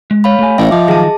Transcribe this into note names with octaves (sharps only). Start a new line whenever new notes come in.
G#3
C#5 F5 B5
A3 G#5
A1 E5 F5 G5
F3 D#5 D6
D#3 F#3 G#4 A5